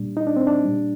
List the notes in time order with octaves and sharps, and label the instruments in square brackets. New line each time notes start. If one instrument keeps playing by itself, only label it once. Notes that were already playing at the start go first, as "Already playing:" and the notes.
Already playing: [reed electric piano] A#2 G3 D4
D#4
D4
C4
D4
A#2 G3